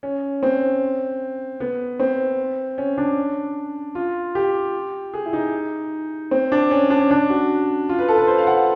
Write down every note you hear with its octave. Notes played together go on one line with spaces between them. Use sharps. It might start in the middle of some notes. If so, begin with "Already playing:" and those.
C#4
C4
B3
C4
C#4
D4
F4
G4
G#4
E4
D#4
C4
D4
C#4
D4
C#4
D4
F#4
F4
B4
A4
B4
C5
F5
F#5